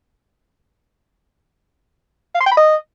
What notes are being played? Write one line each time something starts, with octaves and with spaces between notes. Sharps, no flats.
F5
C6
G5
B5
D#5